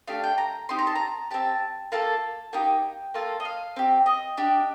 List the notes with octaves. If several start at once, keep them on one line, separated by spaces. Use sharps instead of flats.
A3 D4 G4 F5
G5
A#5
C4 D#4 G4 C6
A#5
A5
A#5
C4 G4 A5
A#3 F4 A4 A5
A#3 D#4 G4 G5
A#3 F4 A4
D#5
F5
C4 G4
D#5
D4 G4